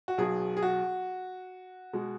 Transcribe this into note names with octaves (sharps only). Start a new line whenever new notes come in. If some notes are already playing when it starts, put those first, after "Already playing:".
F#4
B1 B2 F#3 G#4
G#4
F#4
B2 G#3